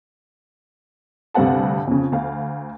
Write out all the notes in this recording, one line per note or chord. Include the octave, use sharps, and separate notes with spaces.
D2 G2 C3 C4 F#5 A5
F2 C#3
D2 F5